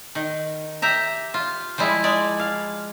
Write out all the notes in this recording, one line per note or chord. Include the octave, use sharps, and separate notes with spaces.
D#3
G4 E5 A#5
F4
F3 G3 G#3 E4
G#3 D5
F5